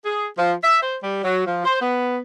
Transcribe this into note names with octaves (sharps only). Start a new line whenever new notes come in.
G#4
F3
E5
C5
G3
F#3
F3
C5
B3